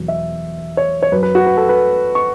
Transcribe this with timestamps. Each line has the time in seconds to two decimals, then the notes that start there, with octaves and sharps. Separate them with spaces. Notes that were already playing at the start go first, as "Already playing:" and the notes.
Already playing: E2 B2 F#3
0.08 E5
0.77 C#5
1.03 C#5
1.12 F#2 F#3 B4
1.23 B4
1.35 F#4
1.46 B4
1.57 A4
1.69 B4
2.15 C#6